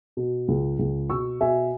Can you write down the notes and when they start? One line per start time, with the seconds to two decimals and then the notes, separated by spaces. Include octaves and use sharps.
0.17 B2
0.48 C#2
0.79 C#2
1.10 B2 C#6 E6
1.40 B2 E5 G#5